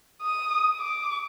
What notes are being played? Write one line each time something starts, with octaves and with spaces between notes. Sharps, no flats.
D#6
D6